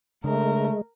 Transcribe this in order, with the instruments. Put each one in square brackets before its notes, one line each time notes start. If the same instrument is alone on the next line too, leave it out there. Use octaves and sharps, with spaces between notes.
[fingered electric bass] C#3 D4 [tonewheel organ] G#3 [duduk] A3 [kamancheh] A#4